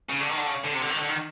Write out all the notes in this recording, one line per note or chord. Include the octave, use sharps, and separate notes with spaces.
C#3
D3
D#3
D3
C#3
D3
C3
D3
D#3
D3
D#3